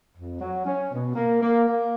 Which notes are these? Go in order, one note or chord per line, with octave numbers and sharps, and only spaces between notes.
F2
F#3
C#4
B2
A#3
A#3
A#3